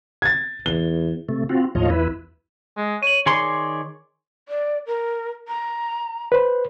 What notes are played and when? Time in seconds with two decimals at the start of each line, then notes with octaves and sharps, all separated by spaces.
0.22 G#6 A6
0.66 E2 G7
1.29 C3 A3
1.49 C4 F4 F#4
1.75 D#2 A2 F3 F4 C#5 D#5
1.90 E2 E4 B4
2.77 G#3
3.03 C#5 D#7 F#7
3.26 D#3 G#4 C#5 D5 C6
4.49 D5
4.87 A#4
5.48 A#5
6.32 B4 C5